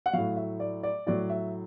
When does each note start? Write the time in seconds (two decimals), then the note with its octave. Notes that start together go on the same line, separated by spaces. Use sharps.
0.06 F#5
0.13 A2 F#3 F5
0.37 E5
0.60 D5
0.83 D5
1.06 A2 F#3 D5
1.30 E5